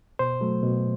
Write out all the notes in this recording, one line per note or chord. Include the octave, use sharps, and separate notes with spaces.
B2 C5
F#3 A3
B2